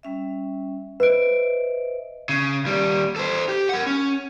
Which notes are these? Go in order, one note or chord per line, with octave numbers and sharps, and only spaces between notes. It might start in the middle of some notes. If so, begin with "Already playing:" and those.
G3 C#4 E5
B4 C5 D#5 E5 D7
C#3
D#2 G3
A4 C5
G4
A#4 F#5
C#4